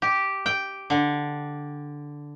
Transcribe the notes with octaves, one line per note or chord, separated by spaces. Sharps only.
G4
G5
D3